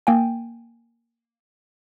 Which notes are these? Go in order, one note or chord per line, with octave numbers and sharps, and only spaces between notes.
A#3 G5 G#5